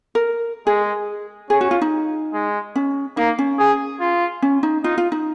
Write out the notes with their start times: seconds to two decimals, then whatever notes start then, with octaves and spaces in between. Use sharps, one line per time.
0.15 A#4
0.67 G#3 G#4
1.50 C#4 G#4
1.61 F#4
1.71 F4
1.82 D#4
2.34 G#3
2.76 C#4
3.17 A#3 D#4
3.39 C#4
3.59 G#4
4.01 F4
4.42 C#4
4.63 D#4
4.84 D#4 F4
4.98 F4
5.12 D#4